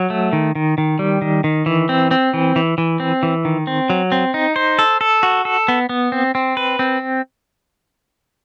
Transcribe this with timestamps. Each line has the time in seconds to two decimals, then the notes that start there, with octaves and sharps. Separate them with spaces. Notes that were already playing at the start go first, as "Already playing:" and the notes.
Already playing: F#3
0.10 A3
0.33 D#3
0.55 D#3
0.78 D#3
0.99 G3
1.22 D#3
1.44 D#3
1.66 E3
1.89 C4
2.11 C4
2.34 E3
2.56 E3
2.78 E3
3.00 C4
3.23 E3
3.45 D#3
3.67 C4
3.90 F#3
4.12 C4
4.34 D#4
4.56 C5
4.79 A4
5.01 A4
5.23 F#4
5.45 A4
5.68 B3
5.89 B3
6.12 C4
6.35 C4
6.57 B4
6.79 C4